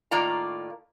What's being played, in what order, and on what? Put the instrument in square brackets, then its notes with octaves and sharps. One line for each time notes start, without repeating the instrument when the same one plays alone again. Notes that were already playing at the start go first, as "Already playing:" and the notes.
[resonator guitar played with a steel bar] A2 D#3 A#3 F4 D5 A#5